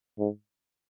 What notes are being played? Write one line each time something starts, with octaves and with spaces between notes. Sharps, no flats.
G#2